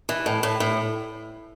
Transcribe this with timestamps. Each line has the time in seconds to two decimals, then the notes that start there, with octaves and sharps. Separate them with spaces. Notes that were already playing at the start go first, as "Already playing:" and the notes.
0.09 E3
0.26 A2
0.43 A2
0.60 A2